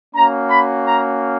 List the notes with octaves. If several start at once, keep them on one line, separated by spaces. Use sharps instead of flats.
A#3 C#4 F#4 A#5
B5
A#5